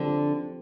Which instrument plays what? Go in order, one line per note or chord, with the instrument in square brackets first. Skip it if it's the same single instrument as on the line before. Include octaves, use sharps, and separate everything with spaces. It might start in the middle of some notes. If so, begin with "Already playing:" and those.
Already playing: [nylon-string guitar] D3 [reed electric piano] F3 C4 G4 C5